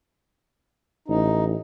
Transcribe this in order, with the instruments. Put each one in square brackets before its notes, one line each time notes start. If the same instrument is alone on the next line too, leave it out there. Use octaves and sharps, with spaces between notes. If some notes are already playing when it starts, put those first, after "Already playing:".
[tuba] A1 [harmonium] D#4